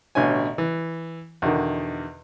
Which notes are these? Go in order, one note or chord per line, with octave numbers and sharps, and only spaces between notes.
A1 B2 D3 C#5 G#5
E3
E2 B2 D3 D#3